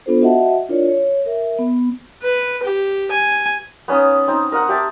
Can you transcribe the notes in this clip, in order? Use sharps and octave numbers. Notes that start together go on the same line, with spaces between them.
B3 D4 F4 A4 C5
F#4 D#5 E5 F#5 A5
D4 E4 F4 A#4 C#5 D5
C#5
A#4 E5
B3
B4
G4
G#5
B3 C#4 D#4 D#5
C4 D#4 A#5
A#4 D#5 F#5
G4 E5 A5 D6